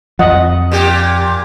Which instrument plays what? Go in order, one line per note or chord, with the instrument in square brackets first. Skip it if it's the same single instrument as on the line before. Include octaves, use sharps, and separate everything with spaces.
[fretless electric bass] F2 F3 [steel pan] D#5 F#5
[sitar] A#2 G4